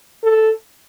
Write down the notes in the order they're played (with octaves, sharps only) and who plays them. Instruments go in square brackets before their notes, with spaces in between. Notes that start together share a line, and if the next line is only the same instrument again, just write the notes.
[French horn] A4